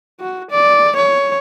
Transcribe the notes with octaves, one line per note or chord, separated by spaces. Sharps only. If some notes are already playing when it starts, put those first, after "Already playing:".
F#4
D5
C#5